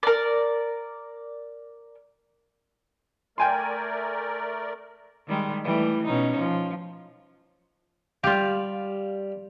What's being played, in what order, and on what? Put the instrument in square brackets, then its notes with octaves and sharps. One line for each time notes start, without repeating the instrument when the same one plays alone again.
[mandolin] A#4 D5
[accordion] A3 A#4 D5 [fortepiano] G5 G#5 C6
[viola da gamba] D#3 G3 G#3
E3 G3 A3
B2 C#4 D#4
F3
[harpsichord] G3 F5 [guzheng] F4 G4